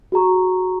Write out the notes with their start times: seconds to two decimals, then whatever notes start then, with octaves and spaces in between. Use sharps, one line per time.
0.12 F#4 G#4 A#5 C#6